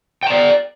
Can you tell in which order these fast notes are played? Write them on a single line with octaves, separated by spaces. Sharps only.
G5 A#5 D5